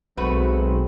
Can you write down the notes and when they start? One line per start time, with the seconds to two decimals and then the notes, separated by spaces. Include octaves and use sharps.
0.17 B1 F#3 G#3 A3 C4 F#4 B4